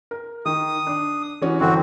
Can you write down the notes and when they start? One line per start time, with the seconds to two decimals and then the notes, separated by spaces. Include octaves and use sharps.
0.11 A#4
0.46 D#3 D#6
0.87 D4 D6
1.42 E3 C#4 F#4
1.61 G1 E3 C4 F#4 A4